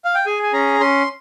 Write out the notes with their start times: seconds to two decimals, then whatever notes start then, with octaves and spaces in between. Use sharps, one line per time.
0.05 F5
0.15 G5
0.26 G#4 G#5
0.43 G#5
0.53 C#4 A#5
0.80 C#4 C6